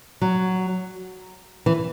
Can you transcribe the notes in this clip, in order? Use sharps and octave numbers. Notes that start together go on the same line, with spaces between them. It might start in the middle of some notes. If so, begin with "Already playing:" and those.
F#3
E3